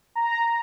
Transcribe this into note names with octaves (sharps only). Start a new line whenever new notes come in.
A#5